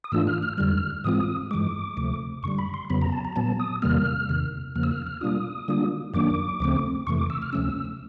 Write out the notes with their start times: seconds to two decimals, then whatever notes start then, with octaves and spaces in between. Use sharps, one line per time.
0.04 D#6
0.12 G#2 E3 A3 D4 F4 E6
0.27 F6
0.43 F6
0.57 F2 D3 G3 F6
1.04 G#2 E3 G#3 C4 F4 D#6
1.51 G2 E3 G#3 D6
1.97 D2 C3 F3 A3
2.43 F#2 D3 G3 C#6
2.58 B5
2.74 C6
2.90 F2 C#3 F#3 B3 B5
3.02 A#5
3.12 A5
3.25 A#5
3.36 A#2 F#3 B3 A5
3.60 D#6
3.82 E2 C3 D#3 G3 A#3 F6
4.29 E2 C3 D#3
4.76 E2 C#3 F3 A#3 F6
4.83 E6
4.91 F6
5.06 F6
5.21 B2 G3 A#3 D4 F4 D#6
5.68 D3 G3 A#3 D4 F4
6.14 F#2 D#3 F#3 A#3 D4 D6
6.60 D2 C#3 F3 A3 C4
7.07 F2 C3 E3 A3 C#6
7.18 D6
7.30 E6
7.42 F6
7.53 D2 C3 F3 A3 C#4 E6